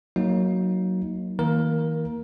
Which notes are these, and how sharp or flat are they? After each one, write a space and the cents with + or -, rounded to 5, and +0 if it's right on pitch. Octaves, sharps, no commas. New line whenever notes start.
F#3 +0 A#3 +0 D#4 +20
D#3 +45 A#3 +0 A#4 +15